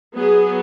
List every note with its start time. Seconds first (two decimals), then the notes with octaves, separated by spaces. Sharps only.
0.15 F#3 B3 G#4